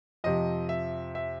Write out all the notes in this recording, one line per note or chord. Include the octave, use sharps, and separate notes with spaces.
F2 C3 F3 D#5
E5
E5